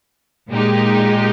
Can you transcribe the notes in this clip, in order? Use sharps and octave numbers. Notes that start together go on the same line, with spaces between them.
A#2 G#3 D#4 G4